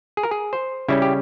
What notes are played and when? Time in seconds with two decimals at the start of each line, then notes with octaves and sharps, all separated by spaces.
0.17 G#4
0.23 A#4
0.31 G#4
0.53 C5
0.88 C#3 G3 C#4 E4
1.02 G4